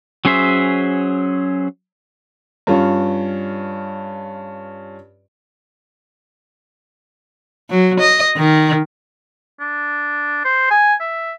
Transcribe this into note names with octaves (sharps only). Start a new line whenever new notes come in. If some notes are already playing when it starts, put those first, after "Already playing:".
F#3 C#4 G#4 C5 E5
G2 C#4 F4
F#3
D#5
D#3
D4
C5
G#5
E5